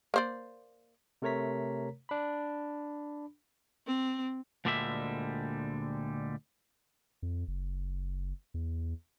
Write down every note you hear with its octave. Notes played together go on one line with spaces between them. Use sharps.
A#3 C5 D5
C3 A3 A#4 C#5 A#5 B6
D4 B5
C4
D2 A#2 D3 G3 G#3 E5
F2
F#1
E2